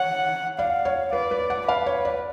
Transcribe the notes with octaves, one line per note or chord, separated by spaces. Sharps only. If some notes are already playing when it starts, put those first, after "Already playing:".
Already playing: C#5 F#5
D5 F5
C#5
B4 D5
B4
F#5
B4 F5
C#5
D5